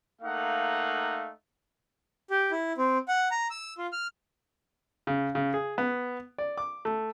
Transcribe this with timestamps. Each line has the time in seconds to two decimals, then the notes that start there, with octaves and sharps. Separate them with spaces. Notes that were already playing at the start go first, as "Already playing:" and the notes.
0.22 A3 A#3 D#4 F5 F#5
2.30 G4
2.51 E4
2.78 C4
3.08 F#5
3.31 A#5
3.50 E6
3.78 F4
3.92 F6
5.07 C#3
5.35 C#3
5.54 G#4
5.78 B3
6.38 D5
6.58 D6
6.85 A3